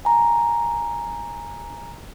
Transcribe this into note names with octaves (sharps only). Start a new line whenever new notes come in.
G#5 A#5